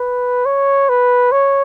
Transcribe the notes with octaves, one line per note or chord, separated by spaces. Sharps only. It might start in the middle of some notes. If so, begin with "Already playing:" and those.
Already playing: B4
C#5
B4
C#5